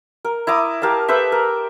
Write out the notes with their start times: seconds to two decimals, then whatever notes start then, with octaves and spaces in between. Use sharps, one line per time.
0.25 A#4
0.47 E4 A#5 D6 D#6
0.82 G4 A#4 F5 A5
1.08 A4 B4 C5 E5
1.32 A#4